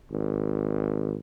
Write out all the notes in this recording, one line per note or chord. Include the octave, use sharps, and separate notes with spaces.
G#1